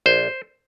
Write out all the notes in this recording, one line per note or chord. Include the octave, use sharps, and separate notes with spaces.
A#1 C5